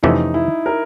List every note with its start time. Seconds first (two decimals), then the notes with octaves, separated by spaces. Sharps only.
0.03 F2 C3 E3 A3 C#4 D#4
0.34 E4
0.66 A#4